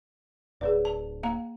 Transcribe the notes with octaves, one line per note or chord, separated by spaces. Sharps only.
D1 G#4 B4 D5
A5
A#3 F5 A#5